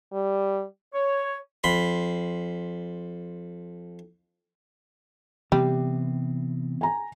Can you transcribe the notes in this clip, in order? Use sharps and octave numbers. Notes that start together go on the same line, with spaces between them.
G3
C#5
F2 B5 C6
C3 E3 G3 B3 C4
G#5 A#5